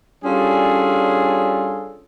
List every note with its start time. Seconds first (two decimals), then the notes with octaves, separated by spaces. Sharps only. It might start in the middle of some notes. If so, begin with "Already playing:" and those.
0.24 G3 C#4 D4 F4 G#4 A4